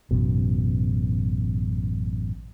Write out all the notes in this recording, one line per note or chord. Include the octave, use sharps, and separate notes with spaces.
A1 F#2 B2